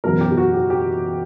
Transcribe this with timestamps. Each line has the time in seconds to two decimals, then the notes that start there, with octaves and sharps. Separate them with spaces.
0.04 F#1 E2 B2 F#3 B3 A#4
0.21 G4
0.32 G4
0.37 F#4
0.54 G4
0.70 G4